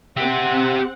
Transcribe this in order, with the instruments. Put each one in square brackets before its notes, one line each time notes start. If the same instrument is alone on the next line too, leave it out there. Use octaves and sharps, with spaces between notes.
[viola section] C4 F#5 [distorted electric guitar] G4 E5